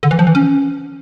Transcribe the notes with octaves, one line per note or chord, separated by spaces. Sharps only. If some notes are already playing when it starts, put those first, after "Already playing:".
D3
E3
F3
E3
C#4